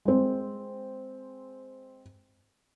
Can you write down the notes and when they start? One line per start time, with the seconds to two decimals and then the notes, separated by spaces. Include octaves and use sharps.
0.05 G#3 C4